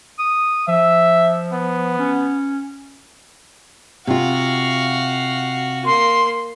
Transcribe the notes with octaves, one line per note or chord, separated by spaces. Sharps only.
D#6
F3 E5
B3
C#4
C3 F4 F#4 F5
A#3 C6